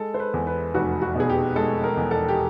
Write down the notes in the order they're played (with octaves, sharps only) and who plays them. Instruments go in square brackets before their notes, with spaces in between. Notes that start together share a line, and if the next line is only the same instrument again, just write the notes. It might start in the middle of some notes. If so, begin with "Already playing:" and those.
Already playing: [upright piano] G#3 A4
C5
B4
E2
B4
F1 F#4
F#4
B2
G#4
G4
G#3 A4
A#4
E2
A4
G4